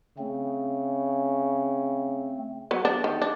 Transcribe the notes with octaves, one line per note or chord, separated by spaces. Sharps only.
C#3 A3 C4
F#3 B3
D4
D#3
D4